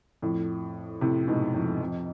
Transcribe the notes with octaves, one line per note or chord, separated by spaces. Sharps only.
F2 A2
A2 C3
G#2 B2
F2 A2
F2